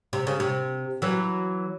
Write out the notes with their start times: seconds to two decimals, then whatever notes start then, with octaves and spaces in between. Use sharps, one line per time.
0.13 C3
0.27 C#3
0.40 C3
1.02 E3 F#3